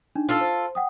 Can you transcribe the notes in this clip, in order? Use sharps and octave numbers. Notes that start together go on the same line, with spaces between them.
D4 D#4
F4 A4
C5
F#5 G5 D#6